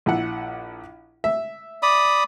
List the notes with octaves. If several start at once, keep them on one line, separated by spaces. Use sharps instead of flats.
A#1 E4 F#5
E5
D5 B5 D#6